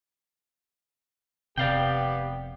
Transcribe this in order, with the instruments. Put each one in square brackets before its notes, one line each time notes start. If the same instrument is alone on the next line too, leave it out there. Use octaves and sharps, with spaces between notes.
[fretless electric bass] F1 C3 [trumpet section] B3 G4 [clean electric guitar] D5 F5 G5